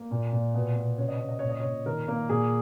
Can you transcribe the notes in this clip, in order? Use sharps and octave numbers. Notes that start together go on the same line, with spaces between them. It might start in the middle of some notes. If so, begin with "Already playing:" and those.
Already playing: A#3
A#2
A#2
B2
B2
C#3 C#5
D#5
C#3 C#5
D#5
A#2 C#5
D#5
A#2 C#5
D#3 A#4
A#3
A#2 G#4